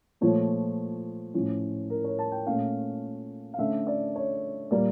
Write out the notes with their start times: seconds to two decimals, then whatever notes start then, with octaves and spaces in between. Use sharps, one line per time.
0.21 A#2 F3 A3 C#5
1.34 A2 F3 C#4
1.90 A#4
2.04 C#5
2.19 A5
2.32 G5
2.46 A#2 A3 C#4 F5
3.54 F5
3.58 D3 A3 C#4 E5
3.87 D5
4.15 C#5
4.71 A#2 G3 A#3 D5